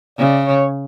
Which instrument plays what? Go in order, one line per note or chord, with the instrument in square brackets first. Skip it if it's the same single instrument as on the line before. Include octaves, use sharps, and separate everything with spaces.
[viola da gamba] C#3 [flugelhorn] D5
[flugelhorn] C#5